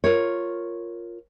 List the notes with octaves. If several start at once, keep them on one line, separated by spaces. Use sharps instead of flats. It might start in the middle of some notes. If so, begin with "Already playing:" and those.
F4 A#4 C#5